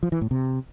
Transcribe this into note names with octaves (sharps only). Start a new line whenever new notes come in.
F3
E3
A2
C3